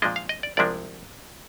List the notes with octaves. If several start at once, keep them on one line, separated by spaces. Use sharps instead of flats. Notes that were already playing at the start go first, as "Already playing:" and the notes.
A#2 F3 G#3 D4 D#5
F5
D#5
D5
C2 C3 F3 G#3 D4 D5